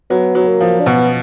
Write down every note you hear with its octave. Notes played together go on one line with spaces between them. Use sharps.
F#3 B3
F#3
A#3
F3
D4
B2 B3